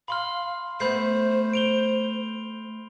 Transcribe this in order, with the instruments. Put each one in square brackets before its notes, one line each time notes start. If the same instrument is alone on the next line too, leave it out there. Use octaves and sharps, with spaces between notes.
[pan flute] F5 [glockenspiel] B5 C6 F6
[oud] A3 B3 [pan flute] C5 [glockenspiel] B5 G6 C7
[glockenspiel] D7 F7 G7